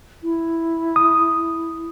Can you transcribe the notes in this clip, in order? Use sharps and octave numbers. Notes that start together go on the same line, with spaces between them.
E4
D#6